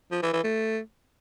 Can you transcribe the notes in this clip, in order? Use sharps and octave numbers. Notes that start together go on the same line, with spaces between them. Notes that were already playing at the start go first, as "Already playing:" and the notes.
F3
E3
E3
A3